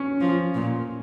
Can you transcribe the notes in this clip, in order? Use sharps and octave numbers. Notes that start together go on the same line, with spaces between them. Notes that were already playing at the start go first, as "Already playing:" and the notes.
Already playing: C#4
F3
A#2